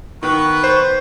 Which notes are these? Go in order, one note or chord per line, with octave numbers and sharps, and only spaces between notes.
D#3 B3 B4 C#6
C5